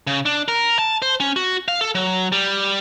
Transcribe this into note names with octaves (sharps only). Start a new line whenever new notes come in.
C#3
D4
A#4
A5
C5
C#4
F#4
F5
A4
F#3
G3